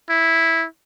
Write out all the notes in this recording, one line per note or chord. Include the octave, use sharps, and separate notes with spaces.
E4